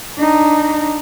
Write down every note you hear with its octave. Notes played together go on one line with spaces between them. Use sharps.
D4 D#4